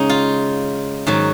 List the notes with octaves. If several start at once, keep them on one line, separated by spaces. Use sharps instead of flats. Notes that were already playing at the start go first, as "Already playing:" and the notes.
Already playing: C#3 G#3 D#4
F4
G#2 D#3 F#3 F#4